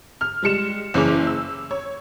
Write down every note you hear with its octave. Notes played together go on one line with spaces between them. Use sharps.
F6
G3 G#3 C#7 E7
F#1 E3 C#4 G#4 D6 F7
E6
C#5